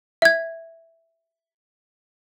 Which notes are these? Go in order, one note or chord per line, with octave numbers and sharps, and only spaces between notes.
E5 G#6